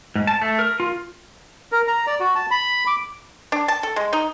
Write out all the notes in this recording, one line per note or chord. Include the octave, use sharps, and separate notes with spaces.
G#2
A5
A3
A#4
F4
A#4
A#5
D5
F#4
A5
B5
D6
D4
A5
A4
G#3
D#4